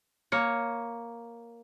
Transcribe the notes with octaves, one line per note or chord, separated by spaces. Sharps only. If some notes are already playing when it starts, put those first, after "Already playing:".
A#3 C#5